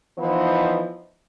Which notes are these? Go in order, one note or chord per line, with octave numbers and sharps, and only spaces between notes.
E3 F3 B3 D#4 C5